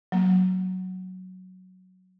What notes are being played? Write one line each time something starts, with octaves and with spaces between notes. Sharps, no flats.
F#3 A#3